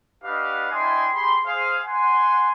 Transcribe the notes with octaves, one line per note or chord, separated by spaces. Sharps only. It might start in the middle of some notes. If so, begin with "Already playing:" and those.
D4 G4 B4 D#5 F5 F#5
D4 E4 D#5 G5 G#5 C6
G4 G#4 B5 C6
G#4 C5 F5
F#5 G#5 C6